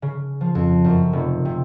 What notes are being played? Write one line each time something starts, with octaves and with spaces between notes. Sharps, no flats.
C#3
F3
F2
F#2
F1
C3